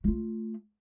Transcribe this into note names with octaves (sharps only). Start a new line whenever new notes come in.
A3 F4